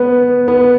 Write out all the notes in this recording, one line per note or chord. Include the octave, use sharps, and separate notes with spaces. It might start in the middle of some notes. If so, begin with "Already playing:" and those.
Already playing: B3
B3